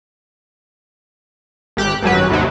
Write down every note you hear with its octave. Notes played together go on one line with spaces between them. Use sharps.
G#1 G4 F#6
G#1 F#2 F#3 B4
D#2 C3 F#3